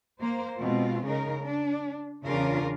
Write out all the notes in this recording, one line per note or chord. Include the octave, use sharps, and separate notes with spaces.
A#3 C5
B2 G#3 C4 F4
C#3 D#4 A#4
D4
E2 C#3 C#4 D4 F4 A#4